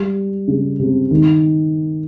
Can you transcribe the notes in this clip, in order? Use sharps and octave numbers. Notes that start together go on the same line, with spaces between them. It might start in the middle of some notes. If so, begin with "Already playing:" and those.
Already playing: G3
C#3
C3
D#3